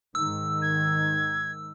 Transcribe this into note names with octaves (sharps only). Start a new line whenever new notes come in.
G#2 D#3 E6
G#6